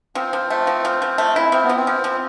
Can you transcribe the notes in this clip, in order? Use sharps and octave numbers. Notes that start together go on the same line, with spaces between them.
F3 C4
F3
A3
F3
F3
F3
A3
E4
F3 C4
B3
F3
C4
F3
F3